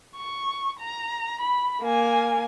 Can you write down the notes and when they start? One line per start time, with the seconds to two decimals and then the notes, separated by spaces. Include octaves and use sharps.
0.17 C#6
0.80 A#5
1.41 B5
1.83 A#3 G#5